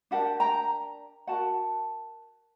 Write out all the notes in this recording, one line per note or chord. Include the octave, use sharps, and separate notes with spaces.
D4 G4 A#4 F#5 A5
G5 A#5
F#4 A#4 F#5 A5